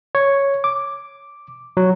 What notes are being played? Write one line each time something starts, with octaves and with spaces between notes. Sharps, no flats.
C#5
D6
F#3